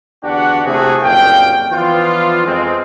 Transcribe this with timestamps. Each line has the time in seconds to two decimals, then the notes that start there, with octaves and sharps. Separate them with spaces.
0.24 E2 D3 D4 F#4 G4 F#5
0.65 C3 A3 E4 F#4 G#4
1.02 F#1 F2 A#2 F5 G5
1.72 E3 F3 B3 D4 F4
2.45 F2 G#3 C4